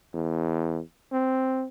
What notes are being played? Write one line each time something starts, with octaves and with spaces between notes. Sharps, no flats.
E2
C4